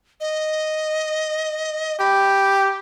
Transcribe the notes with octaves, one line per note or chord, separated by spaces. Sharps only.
D#5
G4 B5